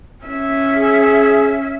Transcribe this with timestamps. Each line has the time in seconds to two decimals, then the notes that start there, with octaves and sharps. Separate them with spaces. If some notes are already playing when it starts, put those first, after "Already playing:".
0.25 C#4 E5
0.76 G#4